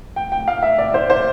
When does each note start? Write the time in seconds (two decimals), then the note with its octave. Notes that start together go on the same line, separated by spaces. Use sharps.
0.16 G5
0.32 G5
0.48 F5
0.63 E5
0.78 D5
0.94 C5
1.10 C5